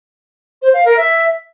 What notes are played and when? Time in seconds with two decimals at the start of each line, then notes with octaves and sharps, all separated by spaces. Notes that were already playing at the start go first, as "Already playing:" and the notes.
0.62 C5
0.74 F5
0.85 A#4
0.97 E5